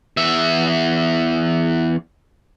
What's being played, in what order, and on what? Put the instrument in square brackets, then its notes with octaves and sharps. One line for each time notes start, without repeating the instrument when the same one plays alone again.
[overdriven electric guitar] E2 E5